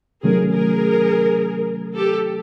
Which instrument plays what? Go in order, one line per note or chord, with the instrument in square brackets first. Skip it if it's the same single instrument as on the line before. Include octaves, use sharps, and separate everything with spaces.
[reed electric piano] C3 D#3 F#3 A3 C#4 [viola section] G#4 A#4
[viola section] G#4 A#4
G4 A4